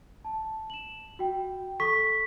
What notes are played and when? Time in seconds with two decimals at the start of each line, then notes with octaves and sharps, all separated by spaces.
0.25 A5
0.70 E7 F#7
1.19 F#4 G5
1.80 A4 C#6 B6